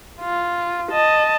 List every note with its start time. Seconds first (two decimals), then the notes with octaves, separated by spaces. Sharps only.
0.21 F4
0.91 D#5 A5